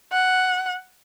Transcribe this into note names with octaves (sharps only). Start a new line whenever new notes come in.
F#5